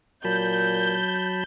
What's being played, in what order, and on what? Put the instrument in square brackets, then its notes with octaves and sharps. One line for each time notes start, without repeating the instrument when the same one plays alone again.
[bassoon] A#2 [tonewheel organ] F#3 A5 B5 [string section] G6